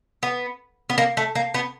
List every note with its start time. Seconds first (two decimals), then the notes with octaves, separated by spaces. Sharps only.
0.23 B3
0.90 B3
0.98 A#3
1.17 A3
1.35 A#3
1.54 B3